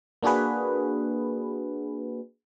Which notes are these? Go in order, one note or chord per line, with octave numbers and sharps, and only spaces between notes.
A#3 D4 F#4 G#4 B4